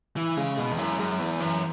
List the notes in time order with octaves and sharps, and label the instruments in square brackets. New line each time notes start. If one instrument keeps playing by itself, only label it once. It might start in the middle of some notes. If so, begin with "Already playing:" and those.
[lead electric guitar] E3 [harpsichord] E4
[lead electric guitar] C#3 [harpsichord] G#3
[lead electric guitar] B2 [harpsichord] G#3
[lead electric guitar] E2
[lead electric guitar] F#2 [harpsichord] E4
[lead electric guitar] F#2 [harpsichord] G#3
[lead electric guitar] E2 [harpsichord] E3
[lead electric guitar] F#2 [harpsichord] E3